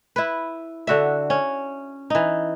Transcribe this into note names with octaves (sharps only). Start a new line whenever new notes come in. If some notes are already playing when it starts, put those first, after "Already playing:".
E4 B4
D3 F#4 E5
C#4
E3 D#4